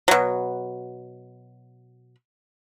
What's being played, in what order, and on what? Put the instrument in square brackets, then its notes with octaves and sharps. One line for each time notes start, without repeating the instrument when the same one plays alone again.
[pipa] B2 F#3